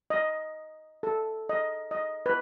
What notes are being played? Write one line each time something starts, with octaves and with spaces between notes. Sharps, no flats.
D#5
A4
D#5
D#5
B4